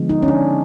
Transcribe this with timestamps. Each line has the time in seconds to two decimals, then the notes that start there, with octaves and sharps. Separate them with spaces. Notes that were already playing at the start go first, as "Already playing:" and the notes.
Already playing: D3 F3 G#3 B3
0.09 D#4
0.22 C#4
0.28 D4